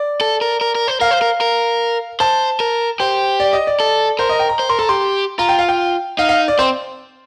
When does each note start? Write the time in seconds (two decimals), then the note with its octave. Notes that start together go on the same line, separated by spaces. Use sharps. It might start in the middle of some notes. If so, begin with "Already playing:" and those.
Already playing: D5
0.21 A4
0.41 A#4
0.61 A#4
0.75 A#4
0.88 C5
1.00 A#4 F5
1.11 C5
1.22 A#4
1.41 A#4
2.20 C5 A5
2.60 A#4
3.00 G4 C5
3.40 D5
3.53 D#5
3.67 D5
3.80 A4
4.19 A#4 C5
4.29 D#5
4.39 G5
4.49 A#5
4.59 C5
4.69 A#4 C6
4.79 A4 A#5
4.89 G4 C6
5.39 F4 A#5
5.49 G5
5.59 F5
5.69 G5
6.19 D#4 F5
6.29 F5
6.48 D5
6.59 C4 C5